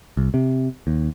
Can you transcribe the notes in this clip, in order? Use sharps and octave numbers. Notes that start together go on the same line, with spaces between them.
C2
C3
D#2